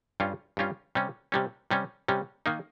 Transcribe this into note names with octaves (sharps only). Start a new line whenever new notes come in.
G2 G3 C#4 F4
G2 G3 C#4 F4
C3 G3 C#4
C3 G3 C#4
C3 G3 C#4
C3 G3 C#4
D#3 A#3 D#4